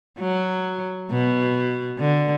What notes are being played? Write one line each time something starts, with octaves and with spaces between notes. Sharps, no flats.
F#3
B2
D3